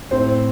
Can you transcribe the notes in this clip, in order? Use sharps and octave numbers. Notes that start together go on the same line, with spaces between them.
A2 C4 C5